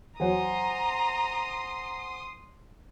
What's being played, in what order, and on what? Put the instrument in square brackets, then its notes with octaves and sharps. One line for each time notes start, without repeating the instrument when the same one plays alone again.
[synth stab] E2 F#3 [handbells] C5 F#5 G#5 [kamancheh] A#5 [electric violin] C6 D#6